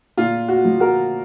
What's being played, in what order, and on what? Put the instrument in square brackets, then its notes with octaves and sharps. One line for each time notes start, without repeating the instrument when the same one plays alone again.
[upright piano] A#2 F4
F#4
F3
F#4 A#4